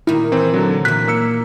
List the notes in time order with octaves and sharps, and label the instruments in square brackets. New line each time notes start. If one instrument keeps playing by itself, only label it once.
[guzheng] A#2 D#3 [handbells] E4
[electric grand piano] E3 C4
D3 F#3
[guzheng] A#2 E3 [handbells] F#6 [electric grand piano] B6
[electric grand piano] A#3 E6 C#7